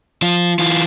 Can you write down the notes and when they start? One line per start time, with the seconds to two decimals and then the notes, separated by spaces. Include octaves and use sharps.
0.22 F3 F4
0.59 E3 F4